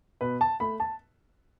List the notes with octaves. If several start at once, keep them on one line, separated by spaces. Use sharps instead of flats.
B2 B4
A5
A3 B5
A5